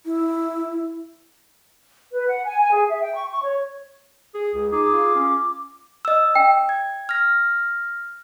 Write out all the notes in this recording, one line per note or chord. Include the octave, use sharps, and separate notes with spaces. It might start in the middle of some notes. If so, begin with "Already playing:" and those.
E4
B4
F#5
G#5
G#5
G#4
E5
G5
C#6
C#6
C#5
G#4
C#2 G#4
D#4 G#4 D6
F4
C#4
D#5 E6
G5
G#6
F6 A#6